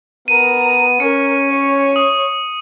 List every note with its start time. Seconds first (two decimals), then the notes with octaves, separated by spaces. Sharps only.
0.28 B3 A#4 A#5 D#7
1.00 C#4 A#4 C#7
1.50 C#5
1.96 D#6